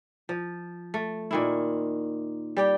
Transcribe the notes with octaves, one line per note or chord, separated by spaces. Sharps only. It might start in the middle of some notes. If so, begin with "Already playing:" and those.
F3
A3
A#2 D#3 E4
G3 G4 G5